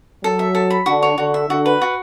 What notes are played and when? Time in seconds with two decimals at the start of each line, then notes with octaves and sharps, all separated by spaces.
0.24 F#3 A4
0.39 E5
0.55 A4
0.70 B5
0.86 D3 F#4
1.03 C#5
1.18 D3 F#4
1.34 E5
1.49 D3 F#4
1.66 B4
1.82 F#4